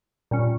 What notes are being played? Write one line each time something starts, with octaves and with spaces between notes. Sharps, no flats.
A#2 G3 C#4